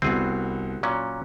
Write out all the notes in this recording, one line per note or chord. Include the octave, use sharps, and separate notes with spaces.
C2 B3 C4 F#4 G#4
A#2 F#3 C#4 F#6